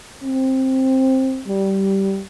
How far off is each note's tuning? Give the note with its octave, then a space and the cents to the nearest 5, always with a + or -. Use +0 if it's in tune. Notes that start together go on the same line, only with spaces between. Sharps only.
C4 +10
G3 -15